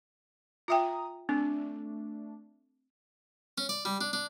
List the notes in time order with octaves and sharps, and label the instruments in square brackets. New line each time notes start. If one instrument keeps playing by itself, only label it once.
[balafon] F4 E5 G5 [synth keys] A#5 D#6
[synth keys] A3 D4 [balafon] C4
[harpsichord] C#4
D5
G3
D4
D4